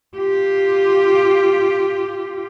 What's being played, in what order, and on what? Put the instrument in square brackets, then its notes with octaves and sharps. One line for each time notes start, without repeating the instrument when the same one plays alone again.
[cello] F4 G4